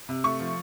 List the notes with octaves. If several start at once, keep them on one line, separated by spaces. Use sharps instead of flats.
C3
A3 C#6
F3